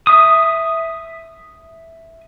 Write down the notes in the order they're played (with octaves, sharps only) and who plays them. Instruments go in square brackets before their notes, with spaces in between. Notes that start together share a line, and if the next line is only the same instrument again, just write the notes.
[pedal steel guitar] E5 D#6